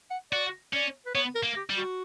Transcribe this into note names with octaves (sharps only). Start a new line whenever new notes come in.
F#5
F#4 D5
C#4 D5
B4
B3 C#5
A#4
A#3
G4
G3
F#4